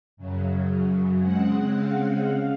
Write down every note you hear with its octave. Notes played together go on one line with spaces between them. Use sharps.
F#2 C#3 F#3
C#3 G#3 C4 F#5
F5
C#3 F5